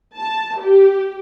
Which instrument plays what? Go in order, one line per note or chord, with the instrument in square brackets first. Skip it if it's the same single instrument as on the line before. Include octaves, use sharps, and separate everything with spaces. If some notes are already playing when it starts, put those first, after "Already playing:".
[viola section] A5
G4